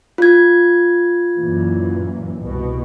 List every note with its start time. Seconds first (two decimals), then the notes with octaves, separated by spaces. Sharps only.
0.18 F4 G#6
1.37 F#2 A#2 E3
2.39 C2 B2